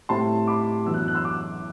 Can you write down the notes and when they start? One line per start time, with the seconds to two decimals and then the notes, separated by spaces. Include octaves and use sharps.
0.09 A2 G3 C4 A5 C6
0.47 B5 D6
0.86 F#2 E3 B3 D4 E6
0.94 F#6
1.01 E6
1.08 F#6
1.15 C6 E6
1.25 D6 F#6